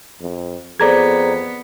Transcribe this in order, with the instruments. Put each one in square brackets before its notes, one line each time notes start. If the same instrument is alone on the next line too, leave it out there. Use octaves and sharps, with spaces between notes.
[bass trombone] F2
[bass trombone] F2 [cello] B3 [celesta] G#4 A4 C5 [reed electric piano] D5 A#5 G#6